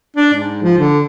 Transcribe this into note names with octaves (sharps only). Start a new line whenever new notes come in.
D4
G#2
F3
D3